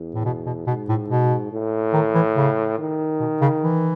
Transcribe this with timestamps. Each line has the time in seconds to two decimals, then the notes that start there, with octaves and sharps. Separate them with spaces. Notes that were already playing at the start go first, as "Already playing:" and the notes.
Already playing: E2
0.15 A2
0.25 B2
0.46 B2
0.67 G#2 B2
0.89 A2
1.10 B2
1.52 A2
1.93 D#3
2.15 E3
2.36 C#3
2.78 D#3
3.20 B2
3.41 C#3
3.62 E3